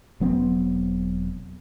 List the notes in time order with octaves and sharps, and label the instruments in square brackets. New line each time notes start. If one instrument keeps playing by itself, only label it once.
[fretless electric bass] E1 F#3 B3 C4